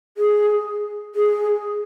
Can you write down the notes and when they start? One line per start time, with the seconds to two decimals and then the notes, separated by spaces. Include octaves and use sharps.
0.18 G#4
1.15 G#4